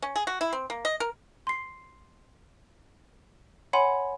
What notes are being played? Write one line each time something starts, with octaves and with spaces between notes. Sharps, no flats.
C#4
G#4
F#4
E4
C4
A#3
D#5
A#4
C6 C7
C#5 F#5 G#5 B5 C6